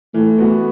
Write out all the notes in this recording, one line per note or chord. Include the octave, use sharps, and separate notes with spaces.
E3 A3
B3 F#4